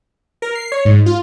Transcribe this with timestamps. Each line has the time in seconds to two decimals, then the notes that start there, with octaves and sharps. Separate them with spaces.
0.42 A#4
0.55 C7
0.72 C#5
0.85 G#2
1.06 F4